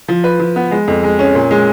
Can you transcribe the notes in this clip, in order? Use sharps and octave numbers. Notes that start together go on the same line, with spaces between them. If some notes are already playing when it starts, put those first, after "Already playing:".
F3
B4
F3
B3
G#3
F2
G#3
C#4
A#2
G#3